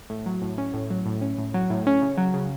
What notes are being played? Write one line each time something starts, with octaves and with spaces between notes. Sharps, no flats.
A2
F#3
A2
C#4
A2
F#3
A2
C#4
A2
F#3
A2
C#4
C#3
F#3
C#3